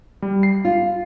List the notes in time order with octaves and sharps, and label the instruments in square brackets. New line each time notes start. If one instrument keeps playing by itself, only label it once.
[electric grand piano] G3
C7
[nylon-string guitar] F4